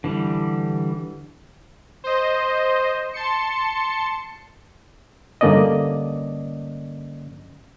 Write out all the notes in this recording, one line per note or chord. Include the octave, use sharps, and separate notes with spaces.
D3 E3 G3
C5 D#5
A5 C6 C#7
G2 D3 A#3 C#4 D5 D#5